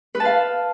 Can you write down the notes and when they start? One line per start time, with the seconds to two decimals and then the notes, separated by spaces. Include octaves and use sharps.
0.15 B4
0.20 A5
0.25 F5